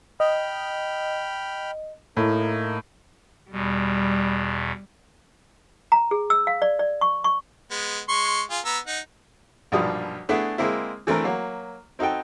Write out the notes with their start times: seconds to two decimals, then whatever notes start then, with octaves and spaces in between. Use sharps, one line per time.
0.20 D#5 G5 B5 F6
2.17 A2 A#3 D#4 A#4
3.51 E2 B2 G3
5.92 A#5
6.11 G#4
6.30 E6
6.47 F5
6.62 D5
6.79 D5
7.01 C#6
7.24 C#6
7.71 G#3 B3
8.09 G#3 C6 C#6
8.50 F4 G#4
8.65 B3 A#5 E6
8.87 D#4 F#5
9.72 B1 G2 A#2 F3 G3 D#6
10.29 A3 B3 D4 E4 G#4
10.58 G#3 A#3 C4 E4
11.07 E3 A3 C4 D4 A#4
11.24 F#3 A#3
11.99 C4 D#4 F#4 A4 G5